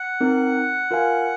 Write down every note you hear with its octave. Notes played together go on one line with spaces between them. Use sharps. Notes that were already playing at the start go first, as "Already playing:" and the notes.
Already playing: F#5
C4 D#4 A#4
F4 A#4 F5 G#5